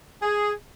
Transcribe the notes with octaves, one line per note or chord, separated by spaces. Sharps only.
G#4